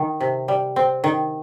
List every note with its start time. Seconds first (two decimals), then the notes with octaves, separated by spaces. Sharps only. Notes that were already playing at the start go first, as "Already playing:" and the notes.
Already playing: D#3
0.21 C3
0.48 G3
0.76 C4
1.04 D#3